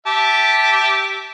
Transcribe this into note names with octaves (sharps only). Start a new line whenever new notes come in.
G4 E5 A5